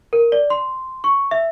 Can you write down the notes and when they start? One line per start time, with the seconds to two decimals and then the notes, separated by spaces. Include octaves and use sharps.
0.13 A#4
0.32 D5
0.50 C6
1.04 C#6
1.31 E5